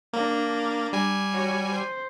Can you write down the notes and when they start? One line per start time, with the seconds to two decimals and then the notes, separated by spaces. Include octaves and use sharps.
0.13 A#3 D4 A#5
0.93 G3 G#5
1.33 F#4 C#5
1.71 C5